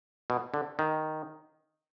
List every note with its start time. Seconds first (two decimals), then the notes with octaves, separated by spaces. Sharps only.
0.30 B2
0.54 D3
0.79 D#3